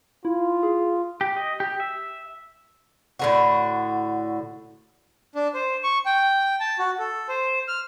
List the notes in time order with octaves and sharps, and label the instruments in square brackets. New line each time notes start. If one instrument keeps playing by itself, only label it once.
[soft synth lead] E4 [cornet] F4
[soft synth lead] G#4
[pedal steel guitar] G4
D#5
G4
E5
[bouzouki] A2 D3 F#4
[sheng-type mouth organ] D4
C5
C#6
G5
A5
F#4
A4
C5
F6